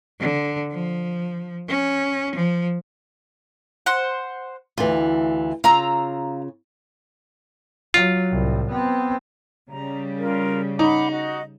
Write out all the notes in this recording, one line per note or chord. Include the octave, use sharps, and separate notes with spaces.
D3
F3
C#4
F3
C5 F#5
D2 E3 F4
C#3 F4 F5 A#5 E6
F#3 F4
C2 A2
B3 C4
C#3 G3 A#5
F4 A#4
D#4 F#5 B5 D6
F#4 D#5